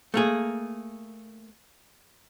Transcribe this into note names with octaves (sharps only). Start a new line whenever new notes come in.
A3 A#3 G#4